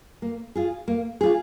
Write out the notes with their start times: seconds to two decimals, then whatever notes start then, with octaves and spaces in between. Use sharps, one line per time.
0.22 A#3
0.56 F4 G#4
0.88 A#3
1.21 F4 G#4